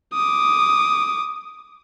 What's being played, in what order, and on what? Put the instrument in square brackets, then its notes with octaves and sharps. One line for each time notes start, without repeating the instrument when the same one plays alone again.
[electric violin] D6 D#6